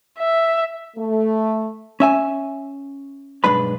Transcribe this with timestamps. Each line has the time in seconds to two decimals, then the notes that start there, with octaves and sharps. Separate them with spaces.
0.19 E5
0.97 A3
2.00 C#4 E5 G#5
3.44 B1 G2 G#3 D4 B4 B5